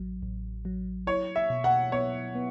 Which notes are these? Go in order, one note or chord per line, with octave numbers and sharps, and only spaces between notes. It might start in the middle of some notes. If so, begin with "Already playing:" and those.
Already playing: A1 F#3
A1
F#3
E4 C#5
E5
B2
F#5
B3 C#5
B3